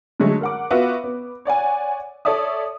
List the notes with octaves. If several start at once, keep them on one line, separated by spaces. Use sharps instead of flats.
D3 F#3 G#3 A3
A#4 F#5 D6
B3 F4 F#4 E5
B3
C#5 D5 F#5 G#5
A4 C#5 D5 E5 D#6